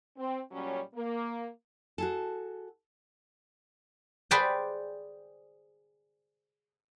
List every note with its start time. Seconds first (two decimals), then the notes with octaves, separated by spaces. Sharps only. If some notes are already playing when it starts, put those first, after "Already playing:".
0.16 C4
0.52 A#2 F#3 G3 C#4
0.94 A#3
1.98 F#4 G#4 A4
4.31 G#4 B4 C5 D5 G5